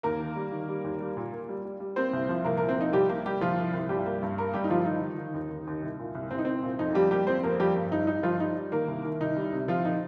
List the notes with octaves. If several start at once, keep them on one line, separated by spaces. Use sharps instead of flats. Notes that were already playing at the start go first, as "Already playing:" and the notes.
D#2 A#3 A#4
D#3
G3
D#3
G3
D#2
G3
A#2
A#3
G3
G3
G3
A#3 C4 C5
C2
F3
C2 A#3 A#4
A#3 A#4
A#2
C4
F3 D#4
C2 G3 G4
A#3 A#4
G3 A#3 G4
C2 F3 F4
C2
C2
G2 G3 G4
A#3
G2
A#3 A#4
G2 G3 G4
D#4
F3 G3 F4
D#3 D#4
D#3
D#3
D#2
D#2
D#2
C2
A#2
C2
C2 C4
D#4
C2 C4
A#2
F2 D#4
F3 G3 G4
G3 A#3 G4
F3 C4 C5
F2 A#3 A#4
F3 G3 G4
G2
G2 D#4
G3 D#4
G2 F3 F4
G3 D#4
G3
D#3 A#3 A#4
C2
D#3
C2 D#4
G3
C3
F3 F4
A#2 D#4